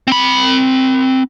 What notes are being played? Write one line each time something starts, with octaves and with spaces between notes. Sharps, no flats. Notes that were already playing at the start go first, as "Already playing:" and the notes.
C4 B5